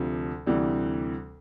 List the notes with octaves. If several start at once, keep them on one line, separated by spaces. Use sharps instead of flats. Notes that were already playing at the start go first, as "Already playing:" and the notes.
Already playing: D2 C3 F3
D2 C3 E3 G3